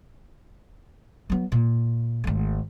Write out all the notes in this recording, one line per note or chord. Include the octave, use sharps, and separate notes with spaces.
F#3 B3
A#2
G#1 A3